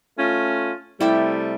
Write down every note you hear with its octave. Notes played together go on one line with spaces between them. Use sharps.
A3 C#4 F4
C3 G3 A3 E4 G4 E5